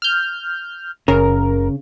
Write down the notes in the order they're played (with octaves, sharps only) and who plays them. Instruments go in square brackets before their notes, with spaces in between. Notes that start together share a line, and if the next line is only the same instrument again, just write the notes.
[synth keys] F6 G6
[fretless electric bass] F#1 [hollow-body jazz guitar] C#3 [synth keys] A#4